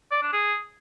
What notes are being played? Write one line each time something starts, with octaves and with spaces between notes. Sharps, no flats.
D5
D4
G#4